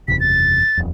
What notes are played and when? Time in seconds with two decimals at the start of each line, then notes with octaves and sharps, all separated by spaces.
0.08 F#1 E2 C3 B6
0.20 A6
0.77 D#1 F2